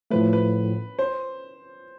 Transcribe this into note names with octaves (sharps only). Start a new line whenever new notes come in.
A2 F3 A3 B4
B4
C5